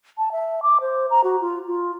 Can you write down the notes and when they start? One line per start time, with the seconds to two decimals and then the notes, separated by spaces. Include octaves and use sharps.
0.18 A5
0.32 E5
0.63 D6
0.81 C5
1.10 A#5
1.24 F#4
1.41 F4
1.67 F4